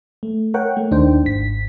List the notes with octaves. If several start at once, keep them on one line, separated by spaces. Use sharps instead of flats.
A3
A#4 C#5 F#5 G5
A3
D#2 D4 D#4 C5 G5
G#1 B6